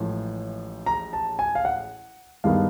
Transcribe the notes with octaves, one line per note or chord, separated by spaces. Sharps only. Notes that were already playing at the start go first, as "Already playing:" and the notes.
Already playing: A1 A2 F3 G#3
A#5
A5
G#5
F5
F#5
G2 D#3 G#3 B3 F5